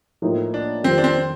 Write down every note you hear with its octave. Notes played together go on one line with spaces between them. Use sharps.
A2 F3 A#3 D#4
D4
F2 D#3 G3 C4
D4
C4